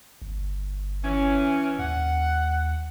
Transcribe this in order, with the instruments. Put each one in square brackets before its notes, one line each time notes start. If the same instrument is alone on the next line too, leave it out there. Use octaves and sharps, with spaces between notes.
[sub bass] G1
[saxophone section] E3 C#4
[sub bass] D#2 [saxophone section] F#5